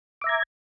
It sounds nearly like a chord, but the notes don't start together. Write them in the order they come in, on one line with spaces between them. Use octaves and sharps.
D6 E5 A#5 G#6